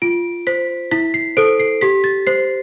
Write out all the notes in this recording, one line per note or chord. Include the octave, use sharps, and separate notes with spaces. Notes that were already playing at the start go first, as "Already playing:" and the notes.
F4 D7
C5 B6
E4 B6
C7
A4 C5 D7
C7
G4 B6
A6
C5 C7